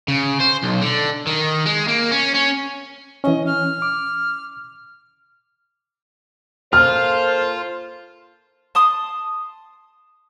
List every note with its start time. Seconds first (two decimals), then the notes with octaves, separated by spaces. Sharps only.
0.08 C#3
0.41 C5
0.63 B1
0.82 D3
1.27 D#3
1.66 G#3
1.88 A#3
2.11 C#4
2.34 C#4
3.24 E3 C#4 D#5
3.46 F6
3.82 D6
6.73 A#3 F4 A4 C5 F6
8.75 A5 C6 D#6